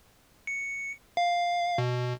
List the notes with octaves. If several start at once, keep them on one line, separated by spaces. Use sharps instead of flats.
C#7
F5
B2